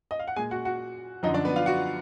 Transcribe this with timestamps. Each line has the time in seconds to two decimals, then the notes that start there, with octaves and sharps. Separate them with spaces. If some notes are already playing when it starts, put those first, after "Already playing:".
0.11 D#5
0.19 F5
0.28 F#5
0.36 A#2 G#3 G#4 G#5
0.51 F#4 F#5
0.65 F#4 F#5
1.23 F#2 D3 F3 D#4 D#5
1.34 D4 D5
1.45 B3 B4
1.56 F4 F5
1.66 F#4 F#5